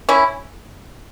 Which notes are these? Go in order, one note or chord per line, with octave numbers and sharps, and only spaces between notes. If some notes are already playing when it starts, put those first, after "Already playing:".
C#4 E4